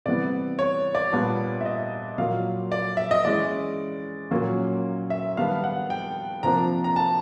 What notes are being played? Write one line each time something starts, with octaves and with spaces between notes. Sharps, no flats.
C3 E3 G3 B3 D5
C#5
D5
A#2 G3 B3 D4
E5
D#5
A#2 F#3 A#3 F5
D5
E5
D#5
E3 G#3 C#4 D5
A#2 F#3 A#3 C#4
E5
D#3 G3 B3 D4 F5
F#5
G5
C3 F3 A#3 D4 A#5
A#5
A5